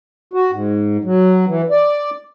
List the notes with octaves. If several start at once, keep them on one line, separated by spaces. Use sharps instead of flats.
F#4
G#2
F#3
E3
D5